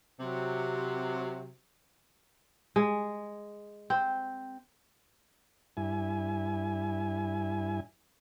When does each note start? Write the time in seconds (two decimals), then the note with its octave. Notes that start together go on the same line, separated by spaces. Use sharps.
0.19 C3 F#3
2.76 G#3
3.90 C4
5.77 G2 E4 G#5